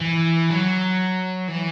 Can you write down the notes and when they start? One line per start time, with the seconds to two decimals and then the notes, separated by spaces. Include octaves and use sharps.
0.01 E3
0.51 F#3
1.48 E3